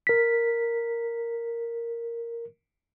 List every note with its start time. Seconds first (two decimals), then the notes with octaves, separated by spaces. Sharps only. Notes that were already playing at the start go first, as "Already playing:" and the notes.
0.07 A#4 B6